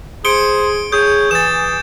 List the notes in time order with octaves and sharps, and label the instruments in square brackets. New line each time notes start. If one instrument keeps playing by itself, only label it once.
[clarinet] G#4 [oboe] C5 [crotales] C#7 D7 G7
[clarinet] G#4 [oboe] C#5 [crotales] G6
[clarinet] E3 [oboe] G#4 [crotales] A6 E7